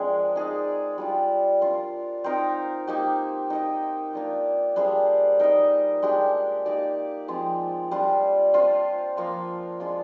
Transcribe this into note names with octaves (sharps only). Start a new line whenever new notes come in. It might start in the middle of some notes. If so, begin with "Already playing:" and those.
Already playing: F3 G#3 C4 D4 F4 G#4 A#4
D#4 G#4 D5
G3 D4 F4
D4 F4 A#4
C4 D#4 A#4
A#3 D#4 G4
D#4 A#4 D#5
A#3 D4 F4
G3 D4 G#4 C5
D#4 A#4 D#5
G#3 D4 G4
A#3 D#4 G4 D5
F3 G#3 C4 F4
G3 D4 F4
D4 F4 C5
F3 A#3 F4
G#3 D4 F4